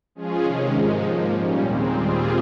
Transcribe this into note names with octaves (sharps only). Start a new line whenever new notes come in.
F3 G#3 C#4 F4 G#4
C3 D#3 G#3 C#4
G#2 F3 G#3 D#4
G#2 F3 A#3
A#2 G3 C#4
D#2 D#3 G#3 C4
A#2 G3 C4 F4 G#4